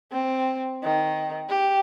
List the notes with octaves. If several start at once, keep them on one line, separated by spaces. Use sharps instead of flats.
C4
D#3
G4